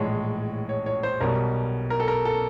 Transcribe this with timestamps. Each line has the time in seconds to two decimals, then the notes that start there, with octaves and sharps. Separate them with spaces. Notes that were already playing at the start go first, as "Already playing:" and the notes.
Already playing: A#1 A2 E3 G#3 C#5
0.69 C#5
0.86 C#5
1.03 C5
1.21 B1 B2 G3 A#4
1.90 A#4
2.00 A4
2.08 A#4
2.25 A4